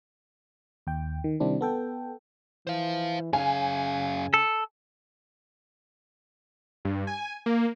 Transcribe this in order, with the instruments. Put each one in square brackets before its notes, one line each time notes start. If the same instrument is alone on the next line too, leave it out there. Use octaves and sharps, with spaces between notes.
[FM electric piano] D#2 G5
D#3
C3 D#3 G3 C4 D4 E4
B3 A4 G5
[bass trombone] E3 [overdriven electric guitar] C5 F5
[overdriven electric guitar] F#2 F5 [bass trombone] C#3 [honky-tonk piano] G#5
[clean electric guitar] A4
[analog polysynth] G2
G#5
A#3